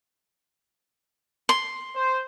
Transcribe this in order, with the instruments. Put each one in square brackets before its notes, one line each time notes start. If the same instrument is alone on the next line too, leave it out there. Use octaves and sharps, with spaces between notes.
[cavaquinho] C6
[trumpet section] C5